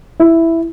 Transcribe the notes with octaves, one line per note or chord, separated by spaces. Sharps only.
E4